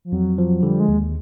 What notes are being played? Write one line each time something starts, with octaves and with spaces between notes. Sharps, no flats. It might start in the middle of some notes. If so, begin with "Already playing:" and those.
F3
F2 F#3
F3
D3 G3
G#3
D#2